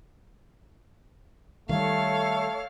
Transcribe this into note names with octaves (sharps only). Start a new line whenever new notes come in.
D#3 G3 A3 A4 C#5 F5